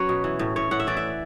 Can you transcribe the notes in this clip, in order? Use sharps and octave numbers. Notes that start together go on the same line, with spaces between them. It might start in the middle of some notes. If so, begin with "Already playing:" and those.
Already playing: F#3 C#4 B4 C#5
B2
E3
A2
A2 C#5
A2 F#5
E5
E3 D5
E5